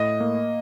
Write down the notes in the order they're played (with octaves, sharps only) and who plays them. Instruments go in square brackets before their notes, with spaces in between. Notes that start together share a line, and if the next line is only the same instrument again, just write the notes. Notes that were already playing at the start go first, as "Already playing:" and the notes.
Already playing: [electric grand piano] A2 [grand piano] D#5
[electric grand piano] A#3